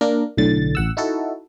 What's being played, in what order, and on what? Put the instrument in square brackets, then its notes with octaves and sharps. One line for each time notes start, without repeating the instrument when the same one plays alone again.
[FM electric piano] A#3 D4 A#4
B1 A2 D3 A6
A1 F#5 E6
D#4 E4 F#4 A4